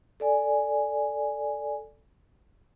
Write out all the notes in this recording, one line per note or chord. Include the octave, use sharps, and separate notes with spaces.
A4 D5 G#5